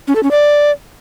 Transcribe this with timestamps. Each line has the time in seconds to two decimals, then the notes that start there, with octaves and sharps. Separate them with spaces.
0.08 C#4
0.15 A4
0.23 C#4
0.31 D5